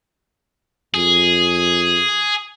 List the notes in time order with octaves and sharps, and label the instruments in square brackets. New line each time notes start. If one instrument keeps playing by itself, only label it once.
[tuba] F2 [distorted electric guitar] G#4